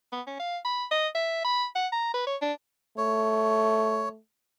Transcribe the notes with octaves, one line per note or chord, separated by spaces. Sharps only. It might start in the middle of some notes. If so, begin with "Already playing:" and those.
B3
C#4
F5
B5
D#5
E5
B5
F#5
A#5
B4
C#5
D4
A3 C#5